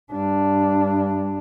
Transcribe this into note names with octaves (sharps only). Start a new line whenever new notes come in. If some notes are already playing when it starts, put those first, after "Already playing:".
G2 D4